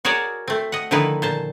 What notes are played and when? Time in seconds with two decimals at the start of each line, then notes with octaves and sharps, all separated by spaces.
0.05 F#4 G#4 A#4 C#5 D5
0.48 A3 C4
0.72 D#5 F#5
0.91 D3 D#3 F3 D#4 E4 B4
1.22 A#2 C5 A5